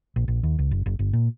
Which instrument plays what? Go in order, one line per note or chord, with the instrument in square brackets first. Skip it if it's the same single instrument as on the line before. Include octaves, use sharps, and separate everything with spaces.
[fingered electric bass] A#1
A#1
D#2
C#2
F#1
F#1
G1
A#2